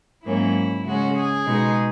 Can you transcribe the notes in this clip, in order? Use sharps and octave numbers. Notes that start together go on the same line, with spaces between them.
G#2 F#3 A#3 C#4 E4
C#3 G#3 C#4 F#4
G#4
B2 G#3 D#4